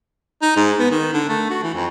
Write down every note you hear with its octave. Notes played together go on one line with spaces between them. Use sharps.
D#4
G#2
B3
D#3
D3
A3
F#4
E3
F2